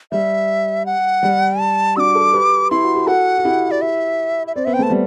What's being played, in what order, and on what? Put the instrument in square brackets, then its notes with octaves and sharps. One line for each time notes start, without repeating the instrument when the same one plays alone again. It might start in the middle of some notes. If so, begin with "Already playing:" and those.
[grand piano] G3 [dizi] E5
[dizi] F#5
[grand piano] G3
[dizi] A5
[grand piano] D4 F#4 [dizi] D6 E6
[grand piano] F#4 A4
G4 B4
[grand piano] E4 [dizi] C6
[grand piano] F#4
G4
[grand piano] F#4 A4 [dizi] F#5
[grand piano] F#4
E4 G4
[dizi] D5
E5
E5
[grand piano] C4 [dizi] D5
[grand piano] B3 [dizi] E5
[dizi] G5
[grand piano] A3 [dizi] A5
[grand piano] G3 B3